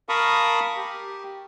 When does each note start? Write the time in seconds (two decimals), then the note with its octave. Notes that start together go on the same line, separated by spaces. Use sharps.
0.09 A#4 F5 A5 B5 C#6 D#6
0.77 G4